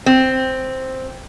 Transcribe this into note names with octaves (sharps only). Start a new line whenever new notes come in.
C4